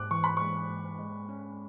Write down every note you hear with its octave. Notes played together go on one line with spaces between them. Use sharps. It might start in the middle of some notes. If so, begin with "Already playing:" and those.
Already playing: G#2 D6 F#6
E3 C#6
B5
G#3 C#6
G#2
G#3
C#4